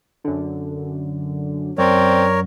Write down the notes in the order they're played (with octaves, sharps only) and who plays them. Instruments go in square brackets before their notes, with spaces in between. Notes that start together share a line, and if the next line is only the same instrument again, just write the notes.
[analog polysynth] F#2 D3
[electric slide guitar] F#2 [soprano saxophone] C4 [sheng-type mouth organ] A#4 C#5 [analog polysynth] D5